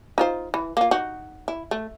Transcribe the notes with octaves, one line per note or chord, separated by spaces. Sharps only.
D#4 F4 C5
E3
A#3 F4
D#4 F#4
E4
A3